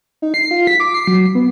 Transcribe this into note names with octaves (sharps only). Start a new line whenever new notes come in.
D#4
C7
F4
B6
D6
C7
F#3
B3